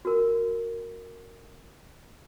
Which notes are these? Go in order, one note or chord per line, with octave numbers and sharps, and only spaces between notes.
F#4 A#4